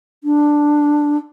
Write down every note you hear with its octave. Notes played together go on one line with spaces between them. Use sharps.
D4